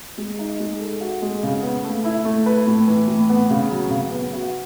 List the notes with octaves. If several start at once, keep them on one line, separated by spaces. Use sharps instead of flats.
G#3
D#4
G#3
A4
F#4
G#3
C#3
B3
A3
E4
A3
B4
A2
E3
A2
B3
C#3
F#3
C#3
B3
F#4